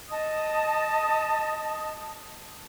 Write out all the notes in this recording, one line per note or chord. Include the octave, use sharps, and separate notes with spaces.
D#5 A5 D#6